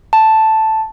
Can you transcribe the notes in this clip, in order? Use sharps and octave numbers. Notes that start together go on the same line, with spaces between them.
A5